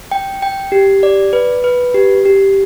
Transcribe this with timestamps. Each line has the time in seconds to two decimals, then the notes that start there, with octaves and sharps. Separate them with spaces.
0.11 G5
0.42 G5
0.72 G4
1.03 D5
1.33 B4
1.64 B4
1.94 G4
2.26 G4